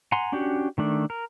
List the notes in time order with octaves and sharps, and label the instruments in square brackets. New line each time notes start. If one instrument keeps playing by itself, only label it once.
[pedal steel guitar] F#5 G#5 A#5 C6
C#4 D4 F#4 G4
D#3 A3 D4
A#4